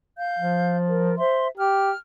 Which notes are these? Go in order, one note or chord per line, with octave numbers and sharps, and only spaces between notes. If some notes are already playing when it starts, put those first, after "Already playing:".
F5 G6
F3
A#4
C5 E5 C6
G4 F6